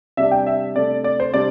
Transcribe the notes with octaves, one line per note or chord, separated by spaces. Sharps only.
C3 G3 D4 E5
G5
E5
C3 A3 D4 D5
D5
C5
C3 G3 D4 D5